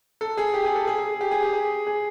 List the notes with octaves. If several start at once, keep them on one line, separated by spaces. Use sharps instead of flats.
A4
G#4
G4
G#4
A4
G#4
G#4
G4
G#4
G4
G#4
G#4